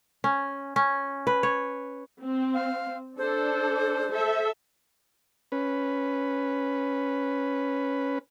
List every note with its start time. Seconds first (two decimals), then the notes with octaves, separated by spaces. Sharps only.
0.24 C#4
0.76 C#4
1.27 B4
1.43 C#5
2.22 C4
2.54 F5
3.18 D4 A4 C5
4.10 A4 E5
5.52 C#4 B4